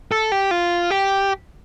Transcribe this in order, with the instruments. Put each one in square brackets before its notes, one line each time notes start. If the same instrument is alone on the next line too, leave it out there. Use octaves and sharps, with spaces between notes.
[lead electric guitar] A4
G4
F4
G4